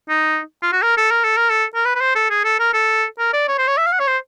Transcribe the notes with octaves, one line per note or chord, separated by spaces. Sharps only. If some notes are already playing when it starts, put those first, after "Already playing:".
D#4
F4
F#4
A#4
A4
A#4
A4
A#4
A4
A#4
B4
B4
C5
A4
G#4
A4
A#4
A4
A#4
D5
C#5
C5
C#5
E5
F5
F#5
C#5
C5